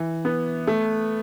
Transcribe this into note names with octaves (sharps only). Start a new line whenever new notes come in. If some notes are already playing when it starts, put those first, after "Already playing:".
Already playing: E3
B3
A3